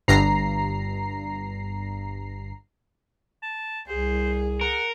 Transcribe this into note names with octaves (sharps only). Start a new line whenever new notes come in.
G1 G2 A#5 C7
A5
C2 G#4 C5
A#4 F#5